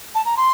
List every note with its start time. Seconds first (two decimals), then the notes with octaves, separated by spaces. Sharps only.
0.15 A5
0.25 A#5
0.37 C6